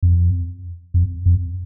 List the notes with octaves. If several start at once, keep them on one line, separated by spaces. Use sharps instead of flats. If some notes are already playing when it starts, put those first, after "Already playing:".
F2
F2
F2